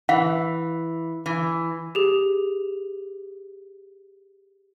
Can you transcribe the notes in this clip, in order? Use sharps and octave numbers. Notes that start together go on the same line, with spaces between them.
E3 F5
E3
G4 G#4